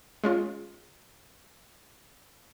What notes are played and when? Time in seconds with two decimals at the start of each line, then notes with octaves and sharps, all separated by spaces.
0.24 G#3 C#4 F4